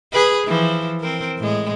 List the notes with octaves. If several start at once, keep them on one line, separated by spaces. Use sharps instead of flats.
G#4 B4
E3 F3
C4 A#4
A2 G#3